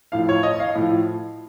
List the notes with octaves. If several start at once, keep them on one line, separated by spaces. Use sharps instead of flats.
A2 F3 F5
C#5
D#5
F5
A2 F3